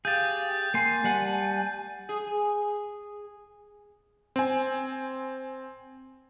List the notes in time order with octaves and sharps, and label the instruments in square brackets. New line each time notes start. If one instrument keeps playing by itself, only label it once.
[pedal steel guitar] G4 G#4 [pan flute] F5 [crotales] G6 A6
[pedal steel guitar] A#3 C6 [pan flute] G#5
[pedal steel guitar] G3 F#5 A5
[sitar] G#4
[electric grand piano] C4 G#5